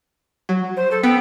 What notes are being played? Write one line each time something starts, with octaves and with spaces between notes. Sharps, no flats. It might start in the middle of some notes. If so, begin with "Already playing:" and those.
F#3
C5
A4
B3 G5